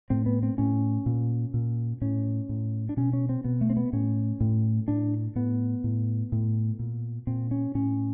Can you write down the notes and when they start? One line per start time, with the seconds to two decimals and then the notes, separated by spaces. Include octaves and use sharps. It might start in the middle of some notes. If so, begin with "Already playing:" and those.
0.10 A2 C4
0.26 B3
0.43 C4
0.58 A2 C#4
1.06 A#2
1.54 A#2
2.01 A2 C#4
2.49 A2
2.89 D4
2.97 B2 C#4
3.13 C#4
3.29 C4
3.44 B2 B3
3.61 A3
3.70 C4
3.77 B3
3.93 A2 C#4
4.40 A2
4.88 A2 D4
5.35 A2 B3
5.84 A2
6.32 A2
6.79 A#2
7.27 A#2 C4
7.51 C#4
7.75 A2 C#4